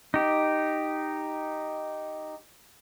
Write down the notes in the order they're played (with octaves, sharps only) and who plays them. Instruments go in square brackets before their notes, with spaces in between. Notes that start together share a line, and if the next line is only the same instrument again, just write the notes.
[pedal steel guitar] D#4 G4